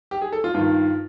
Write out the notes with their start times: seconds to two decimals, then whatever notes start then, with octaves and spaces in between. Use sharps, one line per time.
0.11 G4
0.22 G#4
0.32 A4
0.44 F4
0.54 G2 D#3 F4